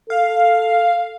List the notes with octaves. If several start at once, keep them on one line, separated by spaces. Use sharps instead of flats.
A4 F5